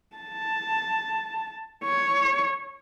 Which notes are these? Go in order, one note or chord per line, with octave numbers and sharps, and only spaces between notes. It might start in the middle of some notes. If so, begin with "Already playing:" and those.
A5
C#5